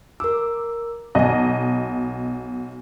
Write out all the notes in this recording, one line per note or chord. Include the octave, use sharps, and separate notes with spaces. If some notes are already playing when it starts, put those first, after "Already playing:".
A#4 D6 E6
B1 D#5 F#5 G#5